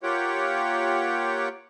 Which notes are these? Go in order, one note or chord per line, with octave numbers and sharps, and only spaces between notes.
A#3 F4 G4 C#5 F#5 G5